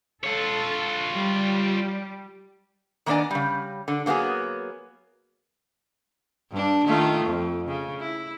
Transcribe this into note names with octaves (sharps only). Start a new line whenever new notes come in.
F4 A4 C#5
G3
D#3 A#3 B3 D4 D5 G#5
C#3 G3
D3
F#3 A#3 B3 F#4 G#4
G2 D4
D#3 A3 F4
F2
C#3
E4